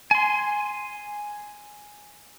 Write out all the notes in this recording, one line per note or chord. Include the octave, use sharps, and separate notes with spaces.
G#5 C6